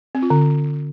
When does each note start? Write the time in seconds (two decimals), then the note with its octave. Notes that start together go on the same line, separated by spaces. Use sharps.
0.15 C4
0.23 F4
0.30 D3